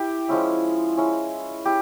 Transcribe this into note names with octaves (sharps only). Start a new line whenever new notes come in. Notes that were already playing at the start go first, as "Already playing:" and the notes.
Already playing: E4 G4
F3 G#3 C#4 E4
G#3 C#4 E4
E4 G4